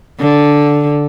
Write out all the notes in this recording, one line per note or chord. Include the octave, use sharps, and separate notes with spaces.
D3